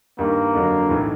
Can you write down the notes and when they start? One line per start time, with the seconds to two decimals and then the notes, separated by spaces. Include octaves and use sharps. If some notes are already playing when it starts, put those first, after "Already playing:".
0.19 G2 D#3 G3 A#3
0.54 F2 D3 F#3
0.89 B1 A2 E3 A3